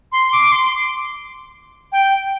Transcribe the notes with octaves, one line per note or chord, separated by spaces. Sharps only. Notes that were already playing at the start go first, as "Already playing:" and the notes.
C6
D6
C6
G5